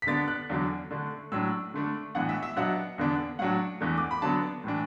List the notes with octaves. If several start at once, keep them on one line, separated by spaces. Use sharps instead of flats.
B6
D3 B3 D4 A6
F#6
E2 D3 F#3 D4
D3 A3 D4
A2 F#3 D4 E6
D3 A3 D4
A2 E3 B3 D4 F#5
E5
E5
B2 F#3 B3 D4 F#5
E2 D3 B3 D4
A2 F#3 D4 F#5
E2 E3 A3 D4
D6
B5
D3 F#3 B3 D4 A5
A2 E3 D4